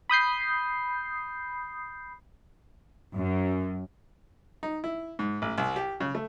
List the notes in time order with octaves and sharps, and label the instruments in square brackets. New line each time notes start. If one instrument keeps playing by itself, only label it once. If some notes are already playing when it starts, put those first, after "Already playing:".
[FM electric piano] B5 D#6 G6 C7
[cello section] F#2
[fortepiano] D#4
E4
G#2
A1
C2
G4
C#3
A3